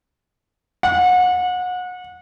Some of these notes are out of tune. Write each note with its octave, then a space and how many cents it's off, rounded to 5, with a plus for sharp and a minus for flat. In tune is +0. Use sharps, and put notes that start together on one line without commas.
F#5 -30